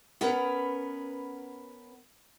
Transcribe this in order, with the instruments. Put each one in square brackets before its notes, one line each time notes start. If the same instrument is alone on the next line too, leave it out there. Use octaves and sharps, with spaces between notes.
[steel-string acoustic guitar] B3 C#4 A#4 B4